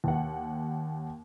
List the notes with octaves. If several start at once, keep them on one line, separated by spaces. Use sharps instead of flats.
D#2 F#5